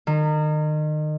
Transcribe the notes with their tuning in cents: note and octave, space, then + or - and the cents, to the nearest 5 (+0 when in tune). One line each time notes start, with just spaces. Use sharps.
D#3 -30